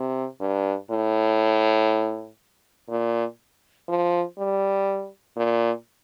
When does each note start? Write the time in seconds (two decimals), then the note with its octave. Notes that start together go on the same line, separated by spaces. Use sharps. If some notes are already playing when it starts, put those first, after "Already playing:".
Already playing: C3
0.41 G2
0.90 A2
2.89 A#2
3.88 F3
4.38 G3
5.37 A#2